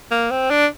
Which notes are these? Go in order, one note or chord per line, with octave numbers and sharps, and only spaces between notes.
A#3
C4
D4